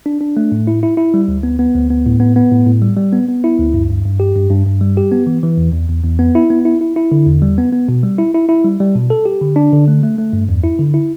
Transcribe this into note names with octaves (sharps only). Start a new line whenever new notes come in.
D4
D4
A3
A2
E4
E4
E4
G3
D2
B3
B3
D2
B3
A2
B3
B3
A2
A2
G3
G3
B3
B3
E4
D2
G2
G2
G2
G4
G2
G2
G2
G3
G4
B3
E3
E3
E2
E2
E2
E2
B3
E4
B3
E4
E4
E4
D3
E2
G3
B3
B3
B2
G3
E4
E4
E4
G3
G3
B2
A4
G4
D3
D4
D3
A3
A3
A3
G2
E2
E4
D3
E4